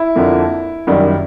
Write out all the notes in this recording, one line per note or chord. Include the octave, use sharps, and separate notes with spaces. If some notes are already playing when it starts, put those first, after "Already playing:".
Already playing: E4
F2 D3 F3 A#3
F#2 D#3 G3